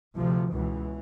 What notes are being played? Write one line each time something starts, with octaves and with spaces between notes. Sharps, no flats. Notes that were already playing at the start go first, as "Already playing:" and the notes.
D2 C3 F3
C#2 B2 E3